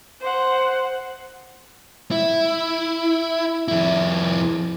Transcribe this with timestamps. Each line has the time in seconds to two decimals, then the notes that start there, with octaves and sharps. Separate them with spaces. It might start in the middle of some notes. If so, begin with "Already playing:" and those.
0.20 C5 F#5
2.11 E4
3.68 F2 E4